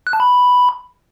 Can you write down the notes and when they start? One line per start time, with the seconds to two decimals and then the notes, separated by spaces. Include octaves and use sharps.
0.07 F#6
0.13 A5
0.20 B5